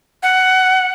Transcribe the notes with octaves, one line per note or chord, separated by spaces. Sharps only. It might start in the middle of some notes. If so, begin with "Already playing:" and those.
F#5